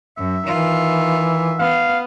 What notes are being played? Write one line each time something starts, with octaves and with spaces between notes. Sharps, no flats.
F#2 E5
D#3 E3 F4
B3 F5